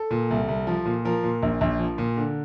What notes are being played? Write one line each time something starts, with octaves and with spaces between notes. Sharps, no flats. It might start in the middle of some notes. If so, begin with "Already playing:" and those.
Already playing: A4
A#2
C2
C2
F3
A#2
F3 A#4
A#2
A#1
A#1
F3
A#2
D3